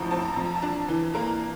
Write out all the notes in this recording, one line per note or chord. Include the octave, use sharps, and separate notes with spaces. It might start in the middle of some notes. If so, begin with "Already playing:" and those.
Already playing: A1 A2 F3 A5 A#5
C4 A5
A#5
F2 A5
A#5
A5
D4
E3
A#3 A#5